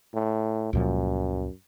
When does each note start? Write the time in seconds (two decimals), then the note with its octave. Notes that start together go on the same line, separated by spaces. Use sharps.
0.13 A2
0.73 C#2 F#2 A#2 F3